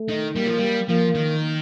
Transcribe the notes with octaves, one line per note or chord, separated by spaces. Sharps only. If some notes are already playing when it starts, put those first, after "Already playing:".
Already playing: A3
D#3
G3 A#3
F3
G3
F3 A#3
D#3